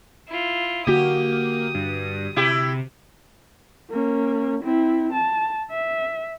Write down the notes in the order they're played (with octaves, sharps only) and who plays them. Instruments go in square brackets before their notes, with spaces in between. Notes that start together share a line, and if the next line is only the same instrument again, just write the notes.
[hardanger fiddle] E4 F4
[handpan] D3 F#4 [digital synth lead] A#3 [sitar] G4 [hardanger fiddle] D#6
[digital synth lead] G2
[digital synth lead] C3 [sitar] E4 G4
[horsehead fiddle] A#3 C#4
C4 E4
A5
E5